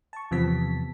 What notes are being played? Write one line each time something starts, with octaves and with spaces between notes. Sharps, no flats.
A5 C#6
E2 C3 F3 B3 A5 B6